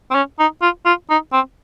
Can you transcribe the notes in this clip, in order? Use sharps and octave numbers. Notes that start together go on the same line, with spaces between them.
C4
C#4
D#4
F4
F4
D#4
C4